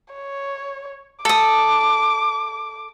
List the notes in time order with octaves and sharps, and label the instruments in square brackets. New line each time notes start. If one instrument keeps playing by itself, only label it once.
[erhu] C#5
[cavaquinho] A4 D#6 [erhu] D6